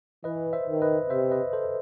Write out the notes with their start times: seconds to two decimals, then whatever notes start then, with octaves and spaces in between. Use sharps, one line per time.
0.24 E3 B4 D#5
0.53 C5 E5
0.67 D#3
0.82 B4 D#5
1.10 C3 C5 E5
1.31 B4 D#5
1.53 A4 C5